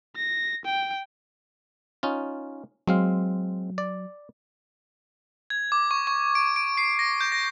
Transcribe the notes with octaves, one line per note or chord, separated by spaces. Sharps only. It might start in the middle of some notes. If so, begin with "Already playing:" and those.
A#6
G5
C#4 D#4 F4
F#3 G#3 C4 F5
D5
G#6
D6
C#6
C#6
D7
D7
C7
A#6
G6
A#6